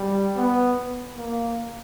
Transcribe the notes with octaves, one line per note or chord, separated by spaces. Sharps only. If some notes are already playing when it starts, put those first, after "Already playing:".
Already playing: G3
B3
A#3